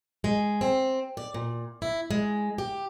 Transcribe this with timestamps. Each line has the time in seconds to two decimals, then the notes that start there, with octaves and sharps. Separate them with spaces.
0.24 G#3
0.61 C4
1.17 D5
1.34 A#2
1.82 E4
2.11 G#3
2.58 G4